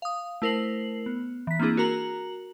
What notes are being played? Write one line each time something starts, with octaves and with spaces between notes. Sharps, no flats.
F5 D#6
A3 E4 A#4 C5 C7 F#7
B3
E3 B6
A#3 C4 D4 E4 G#4
F#4 A#4 A#5 F#7